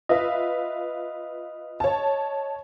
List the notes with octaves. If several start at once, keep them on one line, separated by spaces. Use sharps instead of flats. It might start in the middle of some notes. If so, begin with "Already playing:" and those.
F4 B4 D#5 E5
C#5 A5